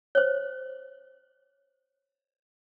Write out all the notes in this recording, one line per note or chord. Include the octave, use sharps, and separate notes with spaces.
C5 C#5